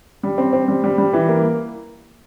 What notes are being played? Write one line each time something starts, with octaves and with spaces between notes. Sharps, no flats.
G3
C4
C4
G3
G3
G3
E3
A#3